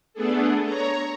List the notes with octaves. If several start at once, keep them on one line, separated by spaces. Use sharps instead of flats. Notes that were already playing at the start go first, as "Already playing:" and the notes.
A3 B3 D4 G#4 A4
C#5 A#5